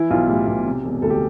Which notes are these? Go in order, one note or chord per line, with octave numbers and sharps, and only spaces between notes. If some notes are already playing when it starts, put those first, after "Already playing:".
Already playing: E3 E4
B1 F4
A2 G4
B1
C3
E1
D2 A4
G4